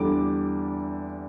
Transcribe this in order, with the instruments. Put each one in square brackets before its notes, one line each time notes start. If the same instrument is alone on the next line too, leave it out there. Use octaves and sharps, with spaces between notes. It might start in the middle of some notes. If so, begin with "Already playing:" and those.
Already playing: [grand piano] E2 D3 G3 D6